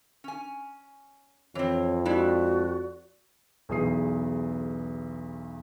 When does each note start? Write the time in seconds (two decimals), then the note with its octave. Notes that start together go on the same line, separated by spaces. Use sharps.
0.24 C#4 G#5
1.55 F2 E3 C4 C#5
2.05 G#3 E4 F#4 D5
3.69 B1 E2 E3 G#4 D#6 C7